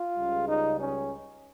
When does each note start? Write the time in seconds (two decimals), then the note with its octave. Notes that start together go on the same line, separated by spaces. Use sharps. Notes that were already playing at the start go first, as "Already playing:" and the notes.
Already playing: F4
0.16 C#2 C#3 G3
0.48 D#4
0.80 C#4